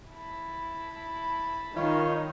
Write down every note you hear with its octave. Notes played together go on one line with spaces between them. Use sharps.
E4 A5 B5
D#3 D#4 F4 C#5